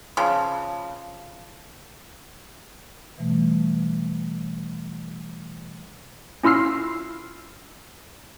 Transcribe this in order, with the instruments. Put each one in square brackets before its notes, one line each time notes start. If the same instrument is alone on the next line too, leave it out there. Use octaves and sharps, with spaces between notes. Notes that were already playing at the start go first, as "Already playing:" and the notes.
[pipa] C#3 F3
[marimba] B2 E3 G3 A3
[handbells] C#4 E4 F4 E6 F6 C7